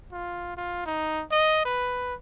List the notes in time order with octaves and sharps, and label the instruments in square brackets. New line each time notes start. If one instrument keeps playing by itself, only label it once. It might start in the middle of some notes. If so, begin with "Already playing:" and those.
[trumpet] F4
F4
D#4
D#5
B4